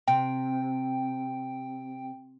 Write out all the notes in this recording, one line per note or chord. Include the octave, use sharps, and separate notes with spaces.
C3 G5